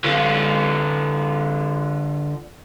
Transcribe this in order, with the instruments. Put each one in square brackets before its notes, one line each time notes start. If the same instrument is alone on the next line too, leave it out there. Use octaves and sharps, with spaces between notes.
[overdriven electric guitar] D3 F4